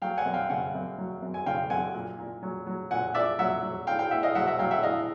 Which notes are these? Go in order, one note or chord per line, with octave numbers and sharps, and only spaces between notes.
F#3 F5 G5
F#5 G#5
F#2
F5 G5
C#3 F#5 G#5
F#2
F#3
F#2
G#5
C#3 F5 G5
F#2 F#5 G#5
A#2
A#2
F#3
F#3
A#2 F#5 G#5
A#2 D5 E5
F#3 E5 F#5
F#3
A2 F5 G5
F5 G5
A2 E5 F#5
D#5 F5
F#3 E5 F#5
E5 F#5
F#3 F5 G5
E5 F#5
A2 D#5 F5